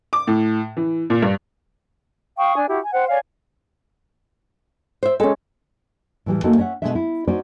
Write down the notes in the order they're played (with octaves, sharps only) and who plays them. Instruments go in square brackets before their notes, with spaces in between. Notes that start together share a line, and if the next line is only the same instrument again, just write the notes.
[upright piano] D6
A2
E3
A#2
G2
[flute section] F5 G5 C#6 D#6
D4 G#5
E4 F#4 G4
G#5
C5 F#5 G5
C#5 D5 F5 G#5
[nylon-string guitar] C5 E5
[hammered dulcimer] G#3 C#4 [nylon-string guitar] A4
[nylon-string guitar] A2 E3 G3
A3 A#3 C#4 D#4 F#4 A4
C#4 C#5 D#5 E5 F#5
B2 E3 G#3 A3 D4 E5
E4
C#4 D#4 F#4 C5 D5